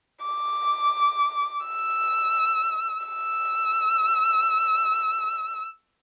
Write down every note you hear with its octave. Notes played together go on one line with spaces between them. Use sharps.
D6
E6
E6